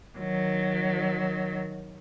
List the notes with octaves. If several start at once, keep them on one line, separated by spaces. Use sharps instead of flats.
D#3 F#3